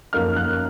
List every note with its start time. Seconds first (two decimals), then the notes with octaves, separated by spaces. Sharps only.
0.13 F#2 F3 A#3 D#4 F6
0.36 F#6